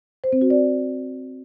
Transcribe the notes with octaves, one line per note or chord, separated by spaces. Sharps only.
C5
C4
F#4
D5